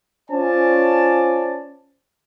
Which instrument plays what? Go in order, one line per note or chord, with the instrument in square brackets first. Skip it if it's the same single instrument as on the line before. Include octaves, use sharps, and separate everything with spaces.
[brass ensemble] C#4 F4 C5 D5 G#5 A5